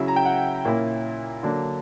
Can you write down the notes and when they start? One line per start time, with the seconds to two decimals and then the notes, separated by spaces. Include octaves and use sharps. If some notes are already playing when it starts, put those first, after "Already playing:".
Already playing: C#3 F#3 C#4 E4 E5
0.08 A#5
0.16 G5
0.25 F#5
0.65 A#2 A#3 C#4 E4
1.43 D3 F#3 A#3 D4